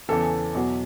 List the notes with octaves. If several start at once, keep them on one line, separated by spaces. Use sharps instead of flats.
E2 C#3 E3 A4
E2 B2 F#3